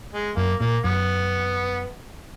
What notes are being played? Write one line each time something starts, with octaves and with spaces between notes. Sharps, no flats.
G#3
F#2 A#3
A#2 A#3
F#2 B3